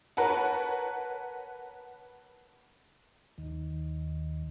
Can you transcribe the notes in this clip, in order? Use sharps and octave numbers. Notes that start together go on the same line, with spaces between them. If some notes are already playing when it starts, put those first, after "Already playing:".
A#4 B4 C#5 F#5 A5
D#2 D#3